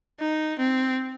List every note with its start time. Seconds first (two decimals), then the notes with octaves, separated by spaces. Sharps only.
0.20 D#4
0.59 C4